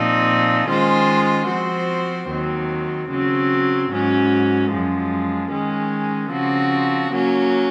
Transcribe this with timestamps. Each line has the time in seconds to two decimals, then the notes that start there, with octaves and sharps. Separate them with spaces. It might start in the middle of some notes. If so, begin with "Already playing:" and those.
Already playing: A#2 F3 C4 D#4
0.68 D#3 G#3 C#4 F4 C5
1.48 F3 C4 F#4 C5
2.29 D#2 D#3 F#3 C4
3.10 C#3 F#3 C4
3.90 G#2 F#3 C#4
4.71 F#2 F3 G#3
5.51 D#3 G#3 C#4
6.32 C#3 F3 C4 F#4
7.12 F#3 A#3 C#4